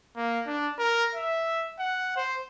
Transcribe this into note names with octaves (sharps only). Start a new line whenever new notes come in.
A#3
D4
A#4
E5
F#5
C5